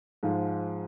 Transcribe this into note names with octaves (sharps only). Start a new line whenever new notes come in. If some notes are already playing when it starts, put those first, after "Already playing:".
G#2 F3 G#3 F4